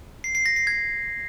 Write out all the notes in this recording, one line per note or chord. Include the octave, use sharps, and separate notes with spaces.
C7
C7
A#6
C7
G#6